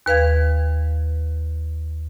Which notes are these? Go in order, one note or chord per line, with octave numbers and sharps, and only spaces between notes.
D#2 B4 F5 G#6